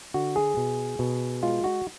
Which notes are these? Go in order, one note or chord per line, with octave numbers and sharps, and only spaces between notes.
D3 F#4
G#4
B2
B2
G#3 F4
F#4